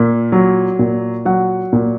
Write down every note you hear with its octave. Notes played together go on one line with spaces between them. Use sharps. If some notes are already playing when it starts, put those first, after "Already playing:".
Already playing: A#2
F#3
A#2
F#3 F#5
A#2